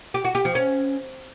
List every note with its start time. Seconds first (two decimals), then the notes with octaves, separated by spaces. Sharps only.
0.14 G4
0.25 F#4
0.35 G4
0.45 F3
0.55 C#4